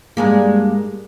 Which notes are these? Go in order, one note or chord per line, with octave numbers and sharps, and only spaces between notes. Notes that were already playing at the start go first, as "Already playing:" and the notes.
G2 G#3 A#3